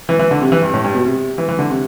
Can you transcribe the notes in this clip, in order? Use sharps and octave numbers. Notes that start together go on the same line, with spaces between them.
E3
E3
D3
C3
E3
G2
A2
G2
B2
C3
E3
E3
D3
C3